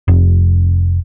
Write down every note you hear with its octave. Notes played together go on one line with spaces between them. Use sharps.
F1